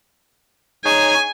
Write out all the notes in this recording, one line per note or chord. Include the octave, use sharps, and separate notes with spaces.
D#4 G#4 C#5 G#5